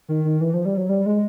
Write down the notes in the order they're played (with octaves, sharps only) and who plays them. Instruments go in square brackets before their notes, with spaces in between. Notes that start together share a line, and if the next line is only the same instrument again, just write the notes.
[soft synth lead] D#3
D#3
E3
F3
G3
F#3
G3
G#3